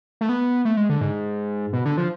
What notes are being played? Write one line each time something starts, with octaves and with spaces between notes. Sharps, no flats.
A3
B3
A3
G#3
D3
G#2
B2
D3
F3